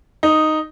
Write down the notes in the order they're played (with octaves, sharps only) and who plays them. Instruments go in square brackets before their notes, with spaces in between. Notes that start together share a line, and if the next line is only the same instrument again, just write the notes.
[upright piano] D#4